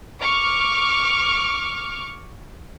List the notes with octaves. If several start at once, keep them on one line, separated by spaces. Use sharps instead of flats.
C#6 D6 F6